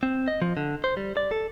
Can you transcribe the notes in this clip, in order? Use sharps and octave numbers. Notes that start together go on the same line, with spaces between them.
C4
D#5
F3
D3
C5
G3
D5
A4